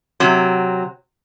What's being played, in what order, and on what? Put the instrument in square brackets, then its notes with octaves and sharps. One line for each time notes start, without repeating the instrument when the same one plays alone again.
[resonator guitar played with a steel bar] C3 F#3